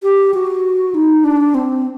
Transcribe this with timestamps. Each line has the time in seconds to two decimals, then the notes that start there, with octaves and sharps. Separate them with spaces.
0.03 G4
0.34 F#4
0.94 D#4
1.24 D4
1.55 C4